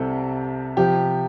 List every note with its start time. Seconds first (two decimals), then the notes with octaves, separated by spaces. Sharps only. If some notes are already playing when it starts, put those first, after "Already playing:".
Already playing: C2 C3 G3 C4 A4
0.77 C3 F3 G4